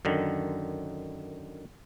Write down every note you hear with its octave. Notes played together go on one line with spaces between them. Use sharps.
F#2 D3 D#3